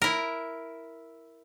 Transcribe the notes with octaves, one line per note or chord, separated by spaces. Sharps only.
E4 A#4